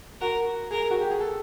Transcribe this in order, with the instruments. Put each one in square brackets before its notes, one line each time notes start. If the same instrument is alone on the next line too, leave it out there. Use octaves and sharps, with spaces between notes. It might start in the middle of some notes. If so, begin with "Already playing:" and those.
[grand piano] F#4 [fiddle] A#4
[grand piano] G#4 [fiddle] A#4
[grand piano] F#4
G4
G#4
A4